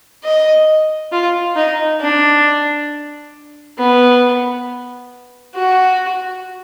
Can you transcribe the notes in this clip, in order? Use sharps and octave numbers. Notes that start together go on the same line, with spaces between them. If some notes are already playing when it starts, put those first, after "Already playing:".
D#5
F4
D#4
D4
B3
F#4